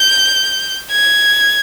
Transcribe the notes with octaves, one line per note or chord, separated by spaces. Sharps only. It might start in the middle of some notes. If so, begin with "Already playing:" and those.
Already playing: G6
G#6